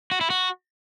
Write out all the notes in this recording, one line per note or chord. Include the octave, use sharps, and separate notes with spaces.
F#4
E4
F#4